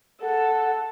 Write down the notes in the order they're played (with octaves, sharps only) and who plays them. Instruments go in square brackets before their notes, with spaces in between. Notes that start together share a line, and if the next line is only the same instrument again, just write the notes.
[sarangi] A4 [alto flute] F#5